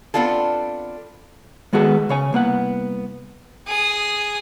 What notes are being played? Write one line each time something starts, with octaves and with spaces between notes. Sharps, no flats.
B3 C4 D4 F4 A4
D#3 G#3 B3 F#4 G#4 A4
C#3 C#5 G#5
C2 A#3 B3 F#5
G#4 D#6